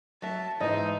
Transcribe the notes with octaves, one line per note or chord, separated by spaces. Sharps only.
F#3 E5 A5
G#2 E3 D#4 D#5